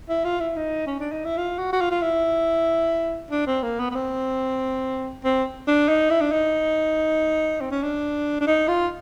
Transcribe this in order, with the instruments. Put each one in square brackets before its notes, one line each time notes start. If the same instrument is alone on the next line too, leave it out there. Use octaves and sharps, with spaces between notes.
[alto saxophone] E4
F4
E4
D#4
C#4
D4
D#4
E4
F4
F#4
F#4
F4
F4
E4
D4
C4
A#3
B3
B3
C4
C4
D4
D#4
E4
D4
D#4
C4
C#4
D4
D4
D#4
F4